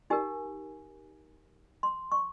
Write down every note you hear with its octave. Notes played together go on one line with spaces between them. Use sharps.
D#4 G4 A#4 G#5
C6
C#6